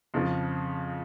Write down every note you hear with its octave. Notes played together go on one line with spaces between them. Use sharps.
F2 C#3 F3